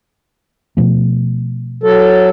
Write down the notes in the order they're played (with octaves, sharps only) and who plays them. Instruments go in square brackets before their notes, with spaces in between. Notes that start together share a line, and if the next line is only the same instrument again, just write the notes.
[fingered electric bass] B2 F3 A3
[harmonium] F#3 A4